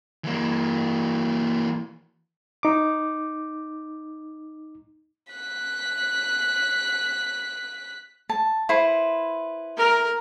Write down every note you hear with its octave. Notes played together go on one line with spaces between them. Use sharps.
E3 A#3
D#4 D6
F#6 B6
A5
E4 B4 C5
A#4